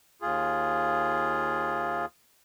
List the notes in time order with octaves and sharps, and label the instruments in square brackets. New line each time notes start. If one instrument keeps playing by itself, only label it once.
[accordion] D#2 F4 G#4